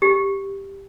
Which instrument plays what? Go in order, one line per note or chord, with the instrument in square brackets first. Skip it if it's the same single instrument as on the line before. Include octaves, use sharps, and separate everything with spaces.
[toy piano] G4